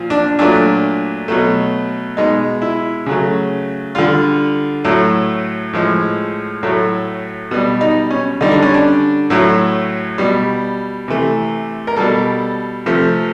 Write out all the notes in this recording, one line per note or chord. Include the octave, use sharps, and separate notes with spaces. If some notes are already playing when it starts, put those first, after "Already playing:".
Already playing: A#2 F3
D4
A#2 F#3 A3 D4
B2 F#3 A3
B2 G#3 D#4
E4
C#3 F#3 A3
D3 G3 F4
A2 F#3 A3
A2 F3 G#3
A2 F#3 A3
B2 G3
D#4
C#4
D3 G3 D#4
D4
C#4
D4
A2 F#3 A3
B2 G3
C3 E3 A3
A#4
B2 G3 A4
C3 F3 A3